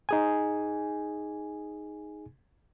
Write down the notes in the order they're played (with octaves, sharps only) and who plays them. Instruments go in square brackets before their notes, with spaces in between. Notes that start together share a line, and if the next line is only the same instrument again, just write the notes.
[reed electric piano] D#4 G#4 G#5